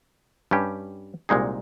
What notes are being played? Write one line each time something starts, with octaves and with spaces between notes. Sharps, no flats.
G2 G3 C#4 G4
C2 A#2 G#3 D#4 G#4